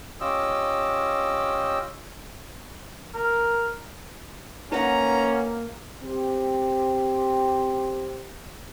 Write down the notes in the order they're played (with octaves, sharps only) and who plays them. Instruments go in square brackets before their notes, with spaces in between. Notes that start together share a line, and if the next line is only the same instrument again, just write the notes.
[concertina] C#4 F4 G4 D#5 E6
[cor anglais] A#4
[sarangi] A#3 [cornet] C#4 [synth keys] D#4 B4 F#5 [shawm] A#5
[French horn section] C4 G4